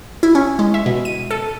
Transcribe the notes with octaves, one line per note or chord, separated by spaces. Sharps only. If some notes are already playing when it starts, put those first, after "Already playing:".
E4
C#4
G#3
E5
B2
D#7
A4